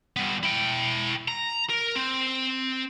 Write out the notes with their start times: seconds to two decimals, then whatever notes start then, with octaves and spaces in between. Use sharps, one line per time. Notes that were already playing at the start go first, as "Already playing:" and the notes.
0.16 G3 B3
0.43 E4 G5
1.28 A#5
1.70 A#4
1.95 C4